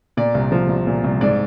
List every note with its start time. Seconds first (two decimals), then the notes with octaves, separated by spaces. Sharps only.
0.17 A#2 D5
0.35 C2
0.52 F3
0.69 C2
0.87 A#2
1.04 C2
1.21 G#2 D5